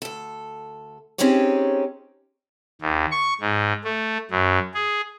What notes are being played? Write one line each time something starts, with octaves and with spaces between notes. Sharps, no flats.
D2 A4
C4 C#4 D#4 G4 G#4 C#5
D#2
C#6
G#2
A3
F#2
G#4